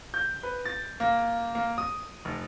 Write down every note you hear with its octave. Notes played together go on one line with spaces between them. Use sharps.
G6
B4
A6
A#3
A#3
D#6
F1